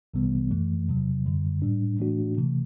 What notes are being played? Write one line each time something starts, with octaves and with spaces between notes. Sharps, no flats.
C2 C3 E3 G3 B3
F#2 E3 A3
E2 C3 F#3
F#2 D3 G3
A2 G3 D4
A2 E3 A3 D4 F#4
C3 E3 A3